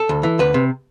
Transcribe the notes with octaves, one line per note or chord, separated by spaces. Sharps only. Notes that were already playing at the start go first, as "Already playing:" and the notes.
Already playing: A4
D2
E3
D2 B4
C3